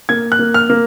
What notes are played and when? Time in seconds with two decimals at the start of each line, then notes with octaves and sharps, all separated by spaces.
0.09 A#3 G#6
0.32 F#6
0.39 A#3
0.54 F6
0.70 A#3